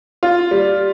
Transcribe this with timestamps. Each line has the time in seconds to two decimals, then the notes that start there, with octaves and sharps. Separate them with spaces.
0.23 F4
0.51 G3